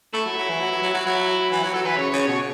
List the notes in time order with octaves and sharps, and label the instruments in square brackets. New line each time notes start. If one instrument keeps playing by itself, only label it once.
[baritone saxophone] A3 [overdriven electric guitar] E4
[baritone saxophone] F#3
F#3
E3
F#3
F#3
F#3
F#3
[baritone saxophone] F#3 [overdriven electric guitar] E4
[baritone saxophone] E3
F#3
[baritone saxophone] F#3 [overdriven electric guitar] A4
[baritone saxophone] E3 [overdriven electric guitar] B4
[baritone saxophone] C#3 [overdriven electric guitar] C#5
[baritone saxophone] C#3
[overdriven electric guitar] C#5
[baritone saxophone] B2